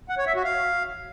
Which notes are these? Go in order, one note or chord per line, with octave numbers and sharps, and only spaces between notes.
F#5
C#5
E5
F#4
F5